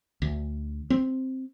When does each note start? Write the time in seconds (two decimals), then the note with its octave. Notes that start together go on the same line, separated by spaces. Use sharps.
0.22 D2
0.90 C4